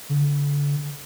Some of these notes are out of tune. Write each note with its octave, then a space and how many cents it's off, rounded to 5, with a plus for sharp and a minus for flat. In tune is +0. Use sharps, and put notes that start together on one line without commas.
D3 -35